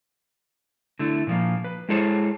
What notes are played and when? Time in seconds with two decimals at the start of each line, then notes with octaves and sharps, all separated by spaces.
0.99 D3 A3 E4
1.27 A#2 F3 A#3
1.64 B4
1.89 G#3 E4 G#4 A4 C5 C#5